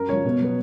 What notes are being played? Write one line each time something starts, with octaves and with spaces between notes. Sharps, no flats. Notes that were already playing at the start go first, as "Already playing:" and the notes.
Already playing: F#2 A#4
C#3 F3 C#5
B2
F#3 B3